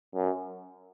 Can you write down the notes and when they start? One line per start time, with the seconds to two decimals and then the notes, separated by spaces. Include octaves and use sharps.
0.15 F#2